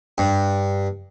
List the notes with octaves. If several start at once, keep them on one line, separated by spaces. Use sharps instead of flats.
G2